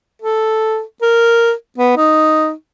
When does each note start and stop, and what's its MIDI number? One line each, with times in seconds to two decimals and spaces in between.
0.22 0.82 69
1.02 1.53 70
1.78 1.97 59
1.97 2.52 63